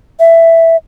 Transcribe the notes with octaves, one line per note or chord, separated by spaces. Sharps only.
E5